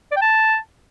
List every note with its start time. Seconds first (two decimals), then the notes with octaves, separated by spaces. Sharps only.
0.11 D5
0.16 G5
0.21 A5